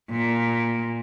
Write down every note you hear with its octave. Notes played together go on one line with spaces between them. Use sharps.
A#2